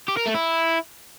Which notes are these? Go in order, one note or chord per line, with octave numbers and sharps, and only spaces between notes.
G4
A#4
A3
E4